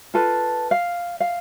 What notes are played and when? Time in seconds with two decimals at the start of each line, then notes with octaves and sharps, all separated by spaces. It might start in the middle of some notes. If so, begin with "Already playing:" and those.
0.14 F4 A4 B4
0.71 F5
1.20 F5